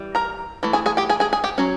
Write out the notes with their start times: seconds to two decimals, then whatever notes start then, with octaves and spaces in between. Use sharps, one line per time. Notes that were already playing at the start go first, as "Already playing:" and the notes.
Already playing: E3 G3
0.15 A#4 A#5
0.63 E3 A3
0.73 G#4 G#5
0.86 G#4 G#5
0.97 G4 G5
1.09 G#4 G#5
1.20 G#4 G#5
1.33 G#4 G#5
1.44 G4 G5
1.58 F#3 A3 C#4